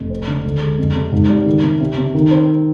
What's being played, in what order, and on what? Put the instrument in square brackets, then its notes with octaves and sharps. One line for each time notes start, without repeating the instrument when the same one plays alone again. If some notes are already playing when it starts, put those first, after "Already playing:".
Already playing: [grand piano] F1
C4
D3
D2
G#3
F2
C3
G#2
G3
D#3
C3
C3
C3
D#3
C4